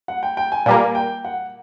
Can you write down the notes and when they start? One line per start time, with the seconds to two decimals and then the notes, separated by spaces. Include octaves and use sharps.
0.08 F#5
0.23 G5
0.37 G5
0.52 G#5
0.66 A#2 G3 A#3 G#5
0.95 G5
1.25 F#5